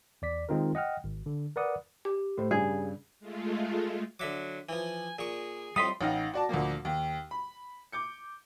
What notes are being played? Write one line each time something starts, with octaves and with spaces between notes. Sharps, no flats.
E2 D5 B6
D#3 G#3 C4 D#4 F4 A#4
D#5 F#5 G5 F6
G#1
D3
A#4 B4 D5 F#5 D#6
G4
A2 C5
G2 C#3 G#4
G#3 A3 F4
D3 F#3 E5 D6
E3 F3 G#5
A#2 G#4 C#6
F2 A2 G3 D#5 F5 C6 D#6 B6
A1 D#4 F5 F#5 F6 A#6
F#4 D5 A5
D2 A#2 F3 A#3
D#2
B5
D6 G6 C#7